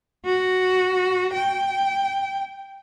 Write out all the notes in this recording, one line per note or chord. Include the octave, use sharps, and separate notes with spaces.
F#4
G5